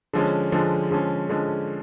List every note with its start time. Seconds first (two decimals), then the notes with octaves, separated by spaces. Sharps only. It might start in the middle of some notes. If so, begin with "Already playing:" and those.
0.13 D3 F3 G#3 C#4
0.52 D3 F3 G#3 C#4
0.91 D3 F3 G#3 C#4
1.29 D3 F3 G#3 C#4